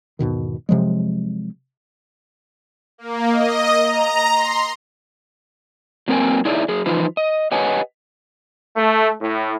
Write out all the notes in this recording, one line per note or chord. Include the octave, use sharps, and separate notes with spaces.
E2 G#2 B2 D#3
C3 F3 F#3 G#3
A#3
D#5
A#5
C6
F#3 A#3 C4 A#4 G5 G#5
D#4 E4 G#4 C#5 D5 E5
F#3 G#4
E3 F3 D#4 F4 B4 C5
D#5
G4 B4 C#5 D#5 F#5 G#5
A3
A2